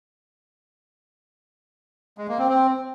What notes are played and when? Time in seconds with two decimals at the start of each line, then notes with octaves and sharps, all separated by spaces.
2.18 G#3
2.28 A#3
2.39 C4
2.49 C4